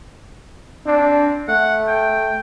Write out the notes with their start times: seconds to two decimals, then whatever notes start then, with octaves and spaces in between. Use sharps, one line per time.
0.86 C4 D4
1.49 A3 F#5
1.88 G5